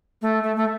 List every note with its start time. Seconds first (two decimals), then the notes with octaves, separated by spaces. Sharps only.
0.22 A3
0.43 A3
0.56 A3